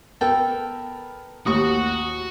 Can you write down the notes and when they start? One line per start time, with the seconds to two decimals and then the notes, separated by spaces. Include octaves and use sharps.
0.21 B3 A4 A#4 G5
1.46 A1 D#2 F#4 G4 F#5 C#6 D#6